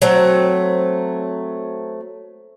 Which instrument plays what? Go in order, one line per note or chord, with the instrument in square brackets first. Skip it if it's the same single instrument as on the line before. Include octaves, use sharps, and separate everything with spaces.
[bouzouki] F#3 A3 C4